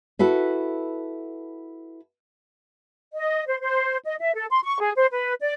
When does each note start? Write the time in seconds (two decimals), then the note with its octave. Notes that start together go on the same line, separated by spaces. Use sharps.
0.19 E4 F#4 A4 B4 E5
3.13 D#5
3.47 C5
3.60 C5
4.05 D#5
4.20 E5
4.34 A4
4.50 C6
4.63 C#6
4.80 G#4
4.96 C5
5.12 B4
5.40 D5